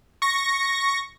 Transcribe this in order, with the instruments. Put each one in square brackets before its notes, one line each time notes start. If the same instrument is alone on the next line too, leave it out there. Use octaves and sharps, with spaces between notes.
[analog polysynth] C#6 A#6